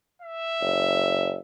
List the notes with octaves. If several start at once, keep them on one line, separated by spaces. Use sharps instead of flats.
E5
F#1